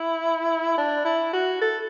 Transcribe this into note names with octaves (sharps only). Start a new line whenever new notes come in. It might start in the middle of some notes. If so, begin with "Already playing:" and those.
Already playing: E4
D4
E4
F#4
A4